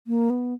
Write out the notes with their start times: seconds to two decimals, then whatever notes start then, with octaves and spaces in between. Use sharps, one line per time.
0.07 A#3
0.30 B3